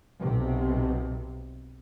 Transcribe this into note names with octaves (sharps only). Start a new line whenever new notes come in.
B1 C3